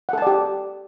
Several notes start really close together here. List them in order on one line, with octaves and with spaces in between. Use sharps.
F#5 A4 A5 D5 G4